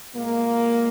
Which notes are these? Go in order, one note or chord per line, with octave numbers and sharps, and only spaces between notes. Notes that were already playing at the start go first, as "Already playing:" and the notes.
A#2 G#3 A#3